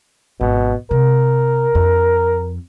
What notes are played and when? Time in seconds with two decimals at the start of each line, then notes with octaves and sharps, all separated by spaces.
0.41 G#1 B2
0.91 C3 A#4
1.75 F2